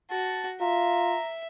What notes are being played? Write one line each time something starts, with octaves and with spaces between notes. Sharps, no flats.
F#4 A5
F4 E5 A#5